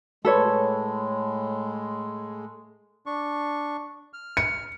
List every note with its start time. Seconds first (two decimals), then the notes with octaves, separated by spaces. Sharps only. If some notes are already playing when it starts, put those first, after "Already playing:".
0.25 A2 G#3 A4 B4 C#5
3.06 D4 C#6
4.13 F6
4.37 C#7